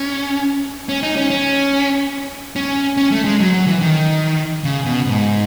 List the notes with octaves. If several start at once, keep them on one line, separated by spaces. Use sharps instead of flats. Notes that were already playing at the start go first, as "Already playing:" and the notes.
Already playing: C#4
C#4
D#4
C#4
C#4
C#4
C#4
A3
G#3
F#3
F#3
E3
D#3
C#3
B2
G#2